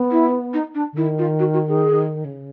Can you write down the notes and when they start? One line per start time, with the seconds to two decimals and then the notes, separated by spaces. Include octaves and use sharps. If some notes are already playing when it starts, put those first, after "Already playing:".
Already playing: B3
0.11 E4
0.54 D#4
0.75 D4
0.93 D3
0.97 D#3 E4
1.19 F4
1.39 F#4
1.54 F#4
1.68 G#4
2.25 C#3